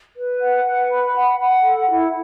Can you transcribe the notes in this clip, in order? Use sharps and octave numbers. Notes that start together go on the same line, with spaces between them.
B4
F#5
B4
B5
F#5
F#5
A4
E4